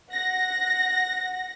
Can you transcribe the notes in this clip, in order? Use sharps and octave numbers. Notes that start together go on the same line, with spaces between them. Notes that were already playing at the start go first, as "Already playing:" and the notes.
F#5 A#6